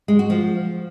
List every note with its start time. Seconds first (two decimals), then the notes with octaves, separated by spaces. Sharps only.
0.08 G#3
0.19 F#4
0.30 F3